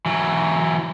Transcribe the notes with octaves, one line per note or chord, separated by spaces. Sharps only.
E3 F#3